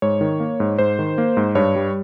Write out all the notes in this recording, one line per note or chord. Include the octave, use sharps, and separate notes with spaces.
G#2 C#5
D#3
A#3
G#2
G#2 C5
D#3
A#3
G#2
G2 C#5
G3